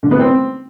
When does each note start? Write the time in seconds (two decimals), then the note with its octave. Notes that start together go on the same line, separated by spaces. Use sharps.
0.03 D3
0.11 B3
0.19 C4